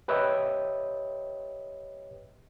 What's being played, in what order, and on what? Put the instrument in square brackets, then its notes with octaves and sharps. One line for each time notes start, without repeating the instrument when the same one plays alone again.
[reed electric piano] G4 B4 C#5 D#5 E5 G5